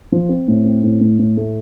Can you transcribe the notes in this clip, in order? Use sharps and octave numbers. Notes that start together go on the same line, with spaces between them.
F3
C4
A2
C4
A2
A2
A2
A3